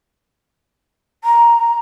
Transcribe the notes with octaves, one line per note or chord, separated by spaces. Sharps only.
A#5